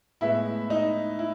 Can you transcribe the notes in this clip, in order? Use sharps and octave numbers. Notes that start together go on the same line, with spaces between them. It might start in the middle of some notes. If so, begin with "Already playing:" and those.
A2 G#3 B3 E4 E5
D#4 D#5
E4